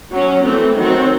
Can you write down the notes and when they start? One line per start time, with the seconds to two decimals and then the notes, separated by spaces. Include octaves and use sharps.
0.11 F#3 C#4
0.44 E3 A3 C4
0.76 D#3 F#3 C4